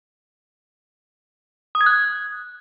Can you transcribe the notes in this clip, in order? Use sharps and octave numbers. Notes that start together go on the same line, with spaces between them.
D#6
G#6
F#6